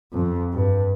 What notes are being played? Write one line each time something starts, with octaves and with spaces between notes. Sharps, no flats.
F2
G2